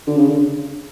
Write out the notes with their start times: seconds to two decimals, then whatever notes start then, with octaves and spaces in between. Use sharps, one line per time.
0.07 D3
0.17 C#3
0.29 D3